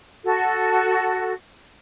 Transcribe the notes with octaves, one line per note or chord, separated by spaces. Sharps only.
F#4 A4